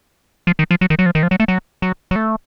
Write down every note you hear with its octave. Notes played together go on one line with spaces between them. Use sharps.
F3
D#3
F3
F#3
D#3
F#3
F3
D#3
F3
F#3
A3
F#3
F#3
F#3
A3